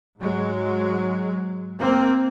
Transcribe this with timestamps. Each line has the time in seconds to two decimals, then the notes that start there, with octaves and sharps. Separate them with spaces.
0.21 G#2 F#3 G#3
1.80 A#3 C4